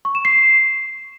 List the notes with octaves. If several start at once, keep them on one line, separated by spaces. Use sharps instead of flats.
C#6
E7
C7